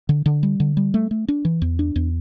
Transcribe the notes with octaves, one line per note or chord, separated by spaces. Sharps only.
D3
D3
G3
D3
G3
A3
A3
D4
E3
E2
D4
E2